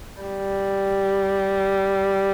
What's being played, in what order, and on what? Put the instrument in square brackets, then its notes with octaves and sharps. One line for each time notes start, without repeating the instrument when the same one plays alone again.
[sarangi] G3